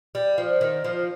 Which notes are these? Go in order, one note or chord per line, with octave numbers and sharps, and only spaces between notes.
G3
F3
D#3
F3